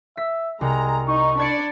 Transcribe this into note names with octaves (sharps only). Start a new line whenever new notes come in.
E5 B6
C2 G#3 A#5
D#4 C#6
D4 D5 B5 G#6 C#7